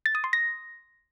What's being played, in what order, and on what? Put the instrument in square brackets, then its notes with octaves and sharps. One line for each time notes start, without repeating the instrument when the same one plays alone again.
[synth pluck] A6
D#6
C6
A#6